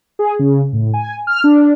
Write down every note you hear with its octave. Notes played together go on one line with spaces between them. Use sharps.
G#4
C#3
A2
G#5
F6
D4